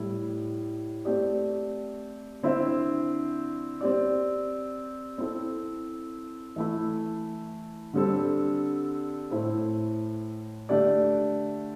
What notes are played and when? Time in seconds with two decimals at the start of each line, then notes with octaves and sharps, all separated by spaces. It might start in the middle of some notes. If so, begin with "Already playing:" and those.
Already playing: A2 G3 E4
1.05 A3 C4 G4 D5
2.43 D3 C4 E4 C5 E5
3.81 C4 G4 D5
5.18 C4 E4 A4
6.56 E3 A3 E4
7.93 D3 G3 C4 A4
9.31 A2 A3 E4 A4 C5
10.69 D3 A3 D4 G4 D5